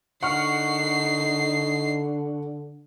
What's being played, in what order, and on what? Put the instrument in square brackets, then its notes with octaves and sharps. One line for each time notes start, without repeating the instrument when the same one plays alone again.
[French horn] D3 [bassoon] D#4 [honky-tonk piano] F#5 C#6 F6 [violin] C7